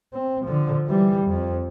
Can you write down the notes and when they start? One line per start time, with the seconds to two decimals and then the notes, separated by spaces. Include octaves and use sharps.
0.13 C4
0.46 D3 F3
0.88 E3 G3
1.27 F2